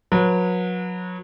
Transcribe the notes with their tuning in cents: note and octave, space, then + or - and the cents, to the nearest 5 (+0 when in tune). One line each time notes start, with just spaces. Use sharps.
F#3 -30 B4 -35